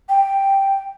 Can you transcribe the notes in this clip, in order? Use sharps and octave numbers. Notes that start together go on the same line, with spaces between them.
G5